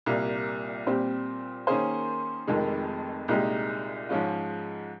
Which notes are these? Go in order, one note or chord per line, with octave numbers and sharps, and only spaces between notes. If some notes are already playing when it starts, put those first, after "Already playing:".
C2 A#2 G3 A#3
A#2 G3 C4 G4 C5
D#3 A#3 C#4 G#4 C5
F1 F2 C3 D#3 G#3
C2 A#2 G#3 D#4 G4
G#2 F3 G#3 C#4 F4